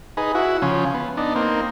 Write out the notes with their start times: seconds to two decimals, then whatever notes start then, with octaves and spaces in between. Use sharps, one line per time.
0.17 D#4 G#4 B4
0.35 E4 F#4
0.62 C#3 F3 C#4
0.94 B3
1.17 B3 D4 D#4
1.36 A#3 C4 D#4